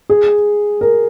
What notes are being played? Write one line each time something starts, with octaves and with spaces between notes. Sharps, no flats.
G#4
A#4